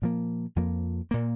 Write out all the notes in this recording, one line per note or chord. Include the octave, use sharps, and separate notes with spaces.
A#2 F3 A#3
F2 F3 A#3
A#2 A#3